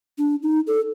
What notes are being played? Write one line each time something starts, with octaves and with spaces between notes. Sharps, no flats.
D4
D#4
A4